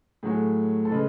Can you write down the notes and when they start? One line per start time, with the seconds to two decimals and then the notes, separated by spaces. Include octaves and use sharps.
0.23 A2 F#3 A3 G#4
0.85 A4
0.91 C#3 G#3 B4